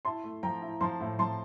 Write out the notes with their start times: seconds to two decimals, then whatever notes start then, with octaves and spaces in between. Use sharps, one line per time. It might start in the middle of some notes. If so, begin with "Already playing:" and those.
0.05 E4 A5 C6
0.24 A3
0.43 F3 G5 A#5
0.62 E4
0.81 F3 A5 C6
1.00 A2
1.19 F3 A5 C6